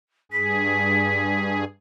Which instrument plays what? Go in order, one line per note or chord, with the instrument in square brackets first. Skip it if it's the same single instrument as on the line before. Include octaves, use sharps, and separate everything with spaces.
[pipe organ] G2 G#4 [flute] B6